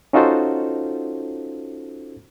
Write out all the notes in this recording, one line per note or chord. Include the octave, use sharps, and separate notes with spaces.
C#4 D#4 F4 F#4 A4 C5